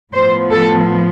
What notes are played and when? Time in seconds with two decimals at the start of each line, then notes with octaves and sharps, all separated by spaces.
0.14 A2 F3 B3 C5
0.52 A4